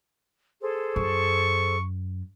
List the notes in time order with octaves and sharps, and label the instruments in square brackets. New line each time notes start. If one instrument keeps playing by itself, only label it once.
[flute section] G#4 A4 C5
[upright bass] F#2 [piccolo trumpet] C#6